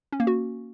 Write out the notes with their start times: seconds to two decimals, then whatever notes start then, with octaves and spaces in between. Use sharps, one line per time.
0.12 C#4
0.20 A#3
0.27 F#4